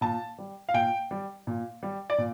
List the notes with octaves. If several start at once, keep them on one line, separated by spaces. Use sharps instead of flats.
A#2 A5
G3
F5
A#2 G5
G3
A#2
G3
D5
A#2